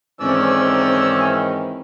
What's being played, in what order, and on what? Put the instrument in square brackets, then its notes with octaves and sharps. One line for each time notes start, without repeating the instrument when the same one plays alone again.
[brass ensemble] G#2 D#3 E3 [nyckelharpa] C4 [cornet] C#4 [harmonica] D5 E6